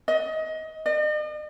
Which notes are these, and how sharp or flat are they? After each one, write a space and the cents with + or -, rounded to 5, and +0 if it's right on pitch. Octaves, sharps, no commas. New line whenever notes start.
D#5 +25
D#5 -45